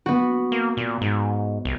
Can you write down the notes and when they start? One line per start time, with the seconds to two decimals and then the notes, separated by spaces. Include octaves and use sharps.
0.06 B3 F#4
0.52 A#3
0.77 A#2
1.01 G#2
1.65 C2